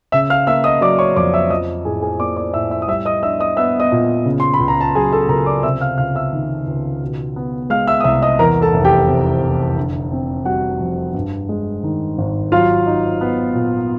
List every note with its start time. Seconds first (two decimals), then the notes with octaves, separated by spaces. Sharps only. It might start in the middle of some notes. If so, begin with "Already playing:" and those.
0.12 C#3 E5 E6
0.30 F5 F6
0.47 A#3 E5 E6
0.64 D#5 D#6
0.81 F#3 D5 D6
0.99 C#5 C#6
1.16 F2 D5 D6
1.34 E5 E6
1.50 F3 D#5 D#6
1.85 A2 G#4 G#5
2.02 G#4 G#5
2.19 A#3 D5 D6
2.37 D5 D6
2.53 A2 E5 E6
2.71 E5 E6
2.82 D#6
2.88 G3 E5 E6
3.05 D#5 D#6
3.23 D4 E5 E6
3.40 D#5 D#6
3.57 B3 E5 E6
3.80 D#5 D#6
3.92 A#2
4.25 C#3
4.40 C6
4.54 B5
4.60 C#2
4.68 A#5
4.81 A5
4.95 F#3 G#4 G#5
5.12 A4 A5
5.29 C#2 A#4 A#5
5.46 D5 D6
5.63 C3 E5 E6
5.81 F5 F6
5.98 C#2 F5 F6
6.15 E5 E6
6.33 D#3
6.67 C#2
7.02 B2
7.36 B3
7.70 G#3 F5 F6
7.87 E5 E6
8.00 D#6
8.04 C2 E5 E6
8.22 D#5 D#6
8.39 E2 A#4 A#5
8.62 A4 A5
8.74 F1
8.85 G4 G5
9.08 C3
9.43 F1
9.76 D3
10.12 C4
10.45 G3 F#4 F#5
10.80 F2
11.14 G2
11.49 G#3
11.83 D#3
12.18 G#1
12.52 F#3 F4 F5
12.87 D#4
13.21 B3
13.55 A#2